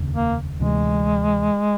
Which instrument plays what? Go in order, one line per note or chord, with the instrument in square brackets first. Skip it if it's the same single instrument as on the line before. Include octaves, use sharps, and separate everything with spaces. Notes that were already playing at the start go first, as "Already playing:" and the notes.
Already playing: [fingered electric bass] F1 D#2 C#3
[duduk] A#3
[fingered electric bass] D2 C3 E3 [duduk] G#3